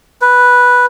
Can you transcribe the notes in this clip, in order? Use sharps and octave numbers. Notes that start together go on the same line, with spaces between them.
B4